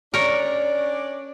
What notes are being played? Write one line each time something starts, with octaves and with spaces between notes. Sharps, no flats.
C#4 D4 A#4 C#5 D5